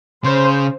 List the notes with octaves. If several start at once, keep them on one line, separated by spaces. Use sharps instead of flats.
C#3 C5